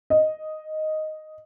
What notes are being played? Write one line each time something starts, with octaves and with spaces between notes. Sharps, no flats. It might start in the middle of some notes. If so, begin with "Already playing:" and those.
D#5